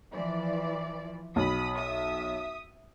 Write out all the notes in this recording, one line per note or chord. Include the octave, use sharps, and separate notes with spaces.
E3 F3 D5
B1 B5 D#6
E5 D#6